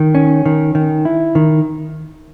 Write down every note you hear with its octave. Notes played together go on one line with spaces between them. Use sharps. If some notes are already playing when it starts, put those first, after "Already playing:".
Already playing: D#3
C#4
D#3
D#3
E4
D#3